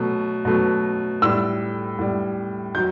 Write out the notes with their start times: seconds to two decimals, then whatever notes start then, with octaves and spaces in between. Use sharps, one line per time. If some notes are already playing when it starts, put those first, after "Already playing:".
Already playing: B2 F#3 A3
0.45 B2 F#3 A3
1.22 A2 G3 E6
1.99 A2 G3
2.75 D#3 F#3 G6